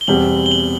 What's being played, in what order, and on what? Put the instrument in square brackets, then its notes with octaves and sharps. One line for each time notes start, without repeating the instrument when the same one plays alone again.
[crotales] G7
[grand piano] E2 B2 G3 C4 [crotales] F#7
[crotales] G7
F#7